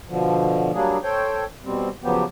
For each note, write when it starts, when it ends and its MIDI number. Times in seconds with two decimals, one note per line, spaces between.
0.09 0.71 47
0.09 0.71 50
0.09 0.71 53
0.74 0.98 54
0.74 0.98 55
0.74 0.98 58
0.74 0.98 62
0.74 0.98 68
1.04 1.44 69
1.04 1.44 72
1.04 1.44 73
1.04 1.44 79
1.65 1.89 47
1.65 1.89 55
1.65 1.89 60
2.03 2.24 49
2.03 2.24 53
2.03 2.24 54
2.03 2.24 59
2.03 2.24 67